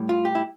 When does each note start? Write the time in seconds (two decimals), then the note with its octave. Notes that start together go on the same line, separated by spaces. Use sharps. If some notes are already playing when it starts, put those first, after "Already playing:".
Already playing: A2 G3
0.09 F4
0.25 G4
0.35 E4